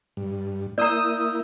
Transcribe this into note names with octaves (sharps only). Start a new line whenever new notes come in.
G2
A#3 E4 D5 A#5 D#6 E6 G6